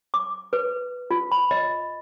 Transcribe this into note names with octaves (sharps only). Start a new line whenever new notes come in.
D6
B4
F4
B5
D#5